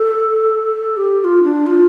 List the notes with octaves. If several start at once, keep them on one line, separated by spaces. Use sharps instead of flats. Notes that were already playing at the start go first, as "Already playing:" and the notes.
Already playing: A4
G4
G4
F4
D4
F4